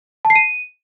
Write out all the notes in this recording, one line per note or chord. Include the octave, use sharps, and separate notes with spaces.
A5
C7
D#7